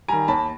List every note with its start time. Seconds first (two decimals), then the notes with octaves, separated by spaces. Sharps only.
0.08 D#3 G3 G#5 A#5
0.28 D#2 A5 B5